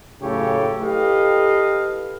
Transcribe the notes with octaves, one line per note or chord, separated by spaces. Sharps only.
F#1 A2 C#3 G4 A4 C#5
E4 G4 A4 B4 D#5 F5